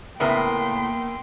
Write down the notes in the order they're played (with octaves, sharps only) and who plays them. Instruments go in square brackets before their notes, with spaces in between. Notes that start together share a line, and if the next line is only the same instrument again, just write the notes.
[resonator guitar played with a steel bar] A2 C#3 [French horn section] A#3 [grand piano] B3 A#4 E5 [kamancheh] G5 C6